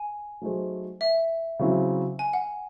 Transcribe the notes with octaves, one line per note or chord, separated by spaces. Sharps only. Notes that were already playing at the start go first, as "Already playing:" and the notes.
Already playing: G#5
F#3 A3 D#4 G#4 C5
E5
C#3 F#3 C4 E4
G#5
F#5